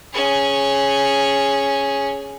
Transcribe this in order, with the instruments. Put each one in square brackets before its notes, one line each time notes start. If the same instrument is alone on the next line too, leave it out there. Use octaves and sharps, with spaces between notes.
[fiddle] C#4 G#4